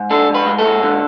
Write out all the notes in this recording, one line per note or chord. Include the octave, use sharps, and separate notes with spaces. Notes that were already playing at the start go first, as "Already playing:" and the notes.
Already playing: G#2
D4 A4
G#2
B4
G#3
A4
G#2
D3